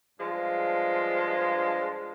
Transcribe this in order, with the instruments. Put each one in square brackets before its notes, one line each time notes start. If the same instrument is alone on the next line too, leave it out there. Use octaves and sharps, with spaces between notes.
[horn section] G2 F3 G#3 D4 F4